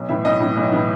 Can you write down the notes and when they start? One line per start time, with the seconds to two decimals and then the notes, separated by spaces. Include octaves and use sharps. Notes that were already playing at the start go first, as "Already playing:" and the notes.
Already playing: B1
0.09 A2 E3 E5
0.25 B1 D#5
0.40 A2 E3
0.57 B1
0.72 A2 E3